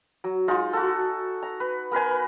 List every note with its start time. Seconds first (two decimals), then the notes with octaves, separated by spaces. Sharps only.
0.24 F#3
0.48 G#3 D#4 F4 F#5
0.73 F#4 A4
1.43 A#5
1.60 B4
1.91 B3 A#4 B4 G#5